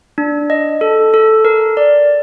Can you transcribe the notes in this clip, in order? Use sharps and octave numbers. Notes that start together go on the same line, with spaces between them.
D4
D#5
A4
A4
A#4
D5